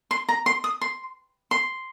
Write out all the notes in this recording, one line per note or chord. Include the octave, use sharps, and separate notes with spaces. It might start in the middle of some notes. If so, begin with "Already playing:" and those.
C6
A#5
C6
D#6
C6
C6